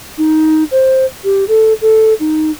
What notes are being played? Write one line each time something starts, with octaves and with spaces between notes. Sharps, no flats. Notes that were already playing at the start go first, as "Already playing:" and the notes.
D#4
C5
G4
A4
A4
D#4